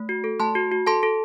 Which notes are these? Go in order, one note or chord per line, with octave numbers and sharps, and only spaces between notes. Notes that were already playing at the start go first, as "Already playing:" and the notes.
Already playing: A3
F#4
A4
A3 A5 C6
F#4
F#4
A4 A5 C6
A4